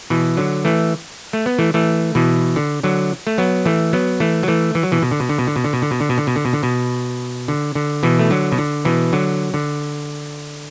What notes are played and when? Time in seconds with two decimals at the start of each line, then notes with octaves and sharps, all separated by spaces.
0.10 B2 E3
0.37 D3 F#3
0.65 E3 A3
1.33 A3
1.46 B3
1.59 E3 A3
1.74 E3 A3
2.15 B2 E3
2.56 D3
2.83 D3 F#3
3.27 A3
3.38 F#3 B3
3.65 E3 A3
3.93 F#3 B3
4.20 E3 A3
4.43 F#3
4.48 E3 A3
4.75 E3
4.83 F#3
4.92 B2 E3
5.02 B2
5.11 D3
5.20 B2
5.29 D3
5.38 B2
5.47 D3
5.56 B2
5.64 D3
5.73 B2
5.82 D3
5.91 B2
6.00 D3
6.09 B2
6.18 D3
6.27 B2
6.36 D3
6.45 B2
6.53 D3
6.63 B2
7.48 D3
7.75 D3
8.03 B2 E3
8.19 A3
8.30 D3 F#3
8.52 B2
8.58 D3
8.85 B2 E3
9.13 D3 F#3
9.54 D3